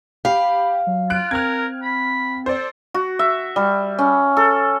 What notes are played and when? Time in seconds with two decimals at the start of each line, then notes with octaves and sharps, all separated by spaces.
0.25 G4 F5 B5
0.87 F#3
1.10 F4 F#6 D7
1.31 C4 A#4 F6 G#6
1.83 B5
2.46 A4 C5 D5
2.94 F#4
3.19 E5
3.56 G3
3.99 C#4
4.37 A4